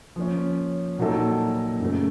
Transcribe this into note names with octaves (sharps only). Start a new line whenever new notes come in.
F3 A#3 C#4
A#2 F#3 A#3 D#4 A4
F#2 C#3 A3